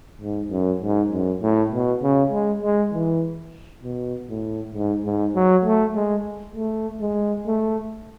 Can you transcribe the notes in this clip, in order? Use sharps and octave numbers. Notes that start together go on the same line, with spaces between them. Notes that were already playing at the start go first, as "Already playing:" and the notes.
G#2
F#2
G#2
F#2
A2
B2
C#3
G#3
G#3
E3
B2
A2
G#2
G#2
F#3
A3
G#3
A3
G#3
A3